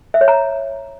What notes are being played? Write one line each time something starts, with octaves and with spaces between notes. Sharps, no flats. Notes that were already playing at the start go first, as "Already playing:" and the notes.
E5
C#5
A#5